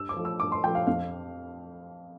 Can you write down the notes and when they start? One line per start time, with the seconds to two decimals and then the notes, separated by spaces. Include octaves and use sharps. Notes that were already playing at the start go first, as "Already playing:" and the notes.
Already playing: G2 E6
0.09 D6
0.16 F3 A3
0.25 E6
0.40 G2 D6
0.52 C6
0.64 F3 A3 G5
0.75 F5
0.87 F2 F5